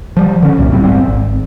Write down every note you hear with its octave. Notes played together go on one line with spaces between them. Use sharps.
F3 G3
D3 C#4
C2 F#2 A#2
D1 A2 G3 C4
G#1 G3 C4
G#1